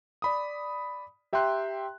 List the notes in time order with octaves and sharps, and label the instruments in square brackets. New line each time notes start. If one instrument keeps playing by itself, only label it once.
[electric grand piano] D5 B5 D#6
G4 E5 G5 A#5 C6 F#6